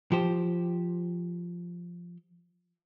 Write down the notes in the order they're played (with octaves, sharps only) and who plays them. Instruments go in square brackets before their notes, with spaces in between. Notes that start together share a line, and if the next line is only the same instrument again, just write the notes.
[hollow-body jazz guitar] F3 G4 C5